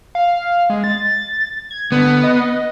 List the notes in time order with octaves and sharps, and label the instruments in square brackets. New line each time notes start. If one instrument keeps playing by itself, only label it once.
[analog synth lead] F5
G#3
A6
G#6
[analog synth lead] D3 [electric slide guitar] B3
[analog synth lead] D#5